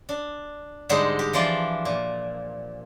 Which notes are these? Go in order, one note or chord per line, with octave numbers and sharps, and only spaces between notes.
D4
G#2 D3 G3 G#3 D#4 C5
G4
E3 F3 D4 F4 D5 C6
A#2